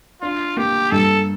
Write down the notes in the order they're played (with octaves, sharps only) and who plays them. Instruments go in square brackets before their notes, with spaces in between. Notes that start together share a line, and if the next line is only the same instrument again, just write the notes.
[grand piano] D4 [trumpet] F4
[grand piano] A#3 [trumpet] G4
[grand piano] G2 [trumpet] A4